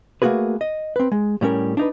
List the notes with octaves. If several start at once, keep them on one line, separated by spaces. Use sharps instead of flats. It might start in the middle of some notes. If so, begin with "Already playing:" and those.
A3 A#3 C#4 F#4 G#4 B4
D#5
C4 B4
G#3
A2 G3 C#4 A#4
D4 D#4 B4